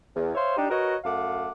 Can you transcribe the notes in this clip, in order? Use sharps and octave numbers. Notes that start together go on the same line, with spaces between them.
E2
C5 C#5 E5 F5 C6
D4 D#4 G4
F#4 A#4 B4 C#5 D#5
F#2 A3 F5 F#5 D6